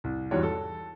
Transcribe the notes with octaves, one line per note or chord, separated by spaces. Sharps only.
C2
E2 G#2 G3 F#4 C#5
A4